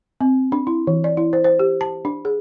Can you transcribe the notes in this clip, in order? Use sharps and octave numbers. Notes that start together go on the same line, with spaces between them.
C4
D4
E4
E3
D5
E4
C5
C5
G4
A5
D4
G#4